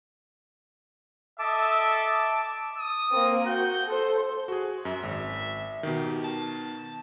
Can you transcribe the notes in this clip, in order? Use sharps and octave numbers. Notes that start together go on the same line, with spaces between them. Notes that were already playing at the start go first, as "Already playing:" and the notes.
A4 D#5 E5 A5 D6
D#6
A#3 C4
F#4 G6
A4 C5
F#4 G#4
F#2 E5
G#1
B2 D#3 G4
A5